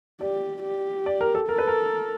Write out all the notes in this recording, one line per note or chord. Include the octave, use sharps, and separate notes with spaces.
G4 D5
G4
D5
A#4
A4
A4 A#4
B4
A#4